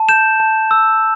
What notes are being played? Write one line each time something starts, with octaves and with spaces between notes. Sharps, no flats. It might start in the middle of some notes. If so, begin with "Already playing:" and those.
Already playing: A5
G6 E7
A5
E6